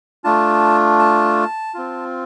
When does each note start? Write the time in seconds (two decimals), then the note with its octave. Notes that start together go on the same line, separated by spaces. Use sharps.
0.24 A3 D4 F4 A5
0.99 A5
1.74 C4 F4